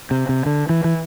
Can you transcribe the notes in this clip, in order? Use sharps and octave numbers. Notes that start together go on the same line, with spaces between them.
C3
C3
D3
E3
E3